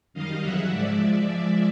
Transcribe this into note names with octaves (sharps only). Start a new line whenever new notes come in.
F#2 D#3 G3 D#5 F5
E2 C#3 F#3 E5 F#5
G#2 F3 G#3 D5 E5